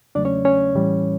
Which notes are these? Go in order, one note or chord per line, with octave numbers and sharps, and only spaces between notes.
E2 C#3 F#3 A3 D4 D5
C#4 C#5
C#4 C#5
A2 E3 G3